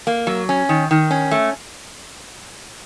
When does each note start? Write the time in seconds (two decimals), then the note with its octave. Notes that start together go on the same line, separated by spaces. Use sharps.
0.07 A#3
0.27 F#3
0.49 C#4
0.69 D#3
0.91 D#3
1.11 C#4
1.31 A3